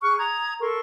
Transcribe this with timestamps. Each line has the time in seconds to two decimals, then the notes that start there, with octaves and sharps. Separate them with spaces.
0.02 G#4 C#6 F6 F#6
0.19 A#5 D#6 G#6
0.61 A4 A#4 C6 C#6